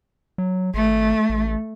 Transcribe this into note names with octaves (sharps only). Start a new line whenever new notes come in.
F#3
G#1 A3
A1